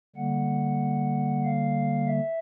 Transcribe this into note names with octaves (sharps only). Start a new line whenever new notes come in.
D3 G3 A#3 F#5
F5
E5